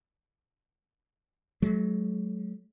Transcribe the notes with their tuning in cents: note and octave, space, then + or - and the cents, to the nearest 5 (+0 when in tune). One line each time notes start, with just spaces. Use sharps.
F#3 +5 A3 -45